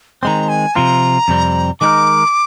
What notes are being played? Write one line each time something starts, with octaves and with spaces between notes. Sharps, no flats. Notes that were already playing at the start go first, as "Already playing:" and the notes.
D#3 G#3 C4 A#5 C6
G#5
C3 F3 C4 F4 A#5
F2 C3 G3 C4
D#3 G#3 D#4 A#4 D6